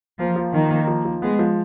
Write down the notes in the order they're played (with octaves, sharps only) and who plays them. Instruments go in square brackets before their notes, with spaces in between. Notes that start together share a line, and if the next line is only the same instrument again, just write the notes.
[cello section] F3 [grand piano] A#3
[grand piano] F3
[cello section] D#3 [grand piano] A#3
[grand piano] A#3
F3
F3
[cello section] G#3 [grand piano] B3
[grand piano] F3